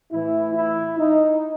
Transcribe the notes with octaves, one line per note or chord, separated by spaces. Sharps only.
A2 E3 E4
E4
D#4